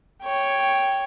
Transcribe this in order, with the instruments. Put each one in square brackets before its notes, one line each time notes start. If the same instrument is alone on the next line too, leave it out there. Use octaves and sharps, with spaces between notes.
[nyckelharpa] C#5 G5